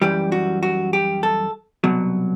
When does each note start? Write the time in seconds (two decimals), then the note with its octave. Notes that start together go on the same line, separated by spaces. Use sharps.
0.01 F#2 E3 G3 G4
0.32 F#4
0.63 F#4
0.93 G4
1.23 A4
1.84 C2 B2 F#3